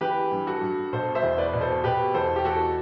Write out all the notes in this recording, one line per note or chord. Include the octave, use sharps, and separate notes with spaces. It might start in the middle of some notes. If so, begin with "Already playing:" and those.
E3 G4 B4
G2
F#4 A4
G2
B2 A4 C5
C5 E5
E2
B4 D5
B2
A4 C5
B2 G4 B4
E2 A4 C5
G4
E2 F#4 A4